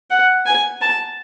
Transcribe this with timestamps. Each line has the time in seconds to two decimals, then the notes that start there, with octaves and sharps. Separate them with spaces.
0.11 F#5
0.46 G#5
0.81 A5